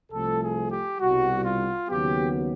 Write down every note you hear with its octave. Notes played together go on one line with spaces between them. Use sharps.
C2 C3 F3 A3 A4
G#4
G4
C2 B2 G3 F#4
F4
D#2 C#3 F#3 B3 G4